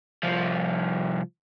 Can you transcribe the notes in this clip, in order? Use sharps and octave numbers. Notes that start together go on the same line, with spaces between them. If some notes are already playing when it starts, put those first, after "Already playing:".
C2 F3